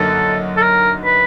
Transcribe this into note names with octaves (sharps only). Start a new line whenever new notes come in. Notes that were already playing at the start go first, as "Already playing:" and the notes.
Already playing: F#2 D3 F#3 A#3 D#4 A4
A4
A#4
B4